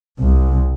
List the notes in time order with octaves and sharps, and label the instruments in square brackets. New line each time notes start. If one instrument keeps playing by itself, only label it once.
[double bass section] C2